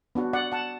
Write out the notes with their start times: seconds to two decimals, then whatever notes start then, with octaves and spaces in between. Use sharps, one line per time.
0.15 B3 D4 F#4
0.33 D5 F#5
0.52 F#5 A5